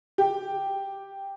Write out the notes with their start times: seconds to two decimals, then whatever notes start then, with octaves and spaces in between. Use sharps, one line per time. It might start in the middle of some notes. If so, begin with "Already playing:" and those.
0.18 G4